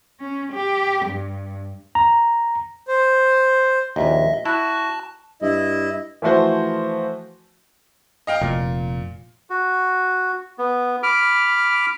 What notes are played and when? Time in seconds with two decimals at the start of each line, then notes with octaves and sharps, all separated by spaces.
0.18 C#4
0.51 G4
1.04 G2
1.95 A#5
2.88 C5
3.96 A#1 D#2 D#5 E5
4.45 E4 F#4 A5
5.42 G2 E4 D#5
6.22 E3 F3 A3 F#4 C5
8.27 D#5 F5 G5
8.41 F1 A#2
9.50 F#4
10.58 B3
11.03 B5 D6 F6